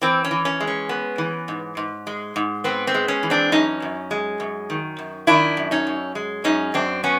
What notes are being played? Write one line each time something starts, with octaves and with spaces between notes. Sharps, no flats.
E3 C4
C#4
E3
C#4
G#3
C#4
B3
E3
G#2
G#2
G#3
G#2
B3 C4
C4
G#3
C#4
E3
C4 D4
F#2 C#4 D#4
F#2
G#3
F#2
D#3
F#2
D#3 D4 E4
F#2
C#4 D#4
F#2
G#3
F#2 C#4 D#4
F#2 C4 D4
B3 C#4